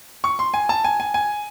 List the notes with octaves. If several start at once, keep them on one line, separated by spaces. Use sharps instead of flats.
C#6
C6
G#5
A5
G#5
G#5
G#5